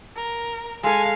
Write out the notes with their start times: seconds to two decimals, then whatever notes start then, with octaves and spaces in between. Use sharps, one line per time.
0.16 A#4
0.83 G#3 A4 F5 G#5